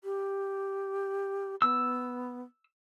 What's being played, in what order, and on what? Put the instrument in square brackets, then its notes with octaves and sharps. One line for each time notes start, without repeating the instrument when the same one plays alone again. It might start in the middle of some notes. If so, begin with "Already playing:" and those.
[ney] G4
[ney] B3 [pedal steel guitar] E6